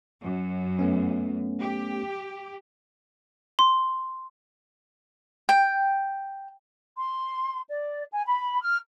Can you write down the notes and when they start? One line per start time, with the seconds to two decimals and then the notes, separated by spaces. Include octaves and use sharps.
0.22 F#2
0.79 A3 B3 C#4
1.60 G4
3.59 C6
5.49 G5
6.97 C6
7.69 D5
8.12 G#5
8.26 B5
8.61 F6